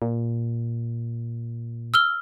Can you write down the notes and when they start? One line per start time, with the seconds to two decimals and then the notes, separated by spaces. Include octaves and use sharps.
0.02 A#2
1.94 E6 F6 G7